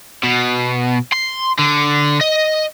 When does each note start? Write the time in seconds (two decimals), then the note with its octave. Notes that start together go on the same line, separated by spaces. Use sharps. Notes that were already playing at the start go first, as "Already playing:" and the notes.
0.23 B2
1.12 C6
1.59 D3
2.21 D#5